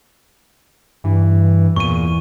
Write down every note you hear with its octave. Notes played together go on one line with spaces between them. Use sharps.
G2 E3
E2 A#2 C#6 D#7